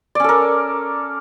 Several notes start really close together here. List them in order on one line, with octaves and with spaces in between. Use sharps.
D5 C#4 A4 A#4